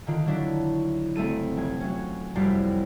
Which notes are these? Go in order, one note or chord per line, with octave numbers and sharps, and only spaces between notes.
D3 D#3 F4
D3 F#3 D4 E4
F#1 A3 C4 A4 D#7
F1 G#5
F#3 C#4
F1 F#2 G3 E4 C5 A6